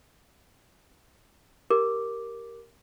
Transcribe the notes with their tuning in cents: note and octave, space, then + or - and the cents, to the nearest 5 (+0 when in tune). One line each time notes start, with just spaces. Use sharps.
G4 +0 A#4 +0 D6 +0